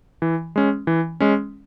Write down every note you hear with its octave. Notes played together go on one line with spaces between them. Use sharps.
E3
G#3 C#4
E3
G#3 C#4